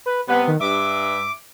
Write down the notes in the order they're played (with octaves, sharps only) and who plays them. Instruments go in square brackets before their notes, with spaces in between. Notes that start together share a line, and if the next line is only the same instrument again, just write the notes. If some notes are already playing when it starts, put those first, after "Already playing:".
[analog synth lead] B4
[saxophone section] C3 G3 B3 [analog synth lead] B4
[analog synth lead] D#3
[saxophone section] G2 E5 [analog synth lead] D6